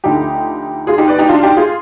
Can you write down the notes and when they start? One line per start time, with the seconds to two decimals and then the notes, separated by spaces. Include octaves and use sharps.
0.04 D2 D3 F3 D#4 G4
0.87 F4 G#4
0.98 D#4 G4
1.08 B4 D5
1.18 D#4 G4
1.29 D4 F4
1.43 D#4 G4
1.57 F4 G#4